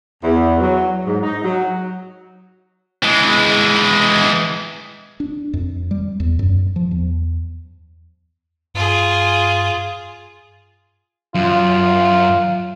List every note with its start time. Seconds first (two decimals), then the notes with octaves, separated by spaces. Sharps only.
0.23 E2
0.60 F#3
1.06 G#2
1.23 D#4
1.44 F#3
3.03 E3 G#3
5.20 D4
5.53 F2
5.91 G3
6.20 E2
6.39 F#2
6.76 F3
6.91 E2
8.75 G2 F4 G#4
11.35 F#2 F4